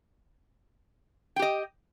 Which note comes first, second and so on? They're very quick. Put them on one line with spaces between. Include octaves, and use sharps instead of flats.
G5 G4 D#5